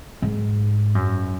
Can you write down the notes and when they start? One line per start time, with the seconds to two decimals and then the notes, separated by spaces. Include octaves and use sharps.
0.22 G#2
0.95 F#2